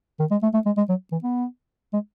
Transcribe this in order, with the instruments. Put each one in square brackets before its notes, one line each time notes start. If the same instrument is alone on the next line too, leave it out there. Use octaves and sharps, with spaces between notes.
[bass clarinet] D#3
G#3
A3
A3
G#3
G#3
F#3
E3
B3
G#3